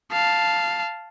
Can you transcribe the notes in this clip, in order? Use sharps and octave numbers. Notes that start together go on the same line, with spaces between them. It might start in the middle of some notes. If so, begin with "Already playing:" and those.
F5 A5